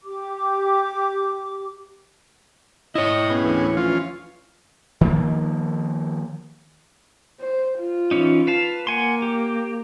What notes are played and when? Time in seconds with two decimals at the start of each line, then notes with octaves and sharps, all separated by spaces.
0.04 G4 D6
2.95 E4 C#5 D#5
3.30 B3 C#4 G#4
3.42 D2 E3
3.77 F3 C#4 F4
5.01 D#3 F3 A#3
7.40 C5
7.79 F4
8.11 E3 C#4 D#4
8.47 B4 F5 A5
8.87 A#3 F#5 G#5 C6
9.22 G4